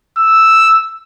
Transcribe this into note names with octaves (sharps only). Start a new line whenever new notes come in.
E6